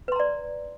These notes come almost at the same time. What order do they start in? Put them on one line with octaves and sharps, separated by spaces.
B4 C6 A#5 D5